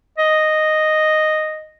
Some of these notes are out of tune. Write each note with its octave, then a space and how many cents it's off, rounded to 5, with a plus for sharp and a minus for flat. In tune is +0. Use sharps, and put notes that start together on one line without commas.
D#5 -5